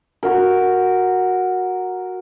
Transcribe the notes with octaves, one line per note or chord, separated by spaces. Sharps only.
F#4 A#4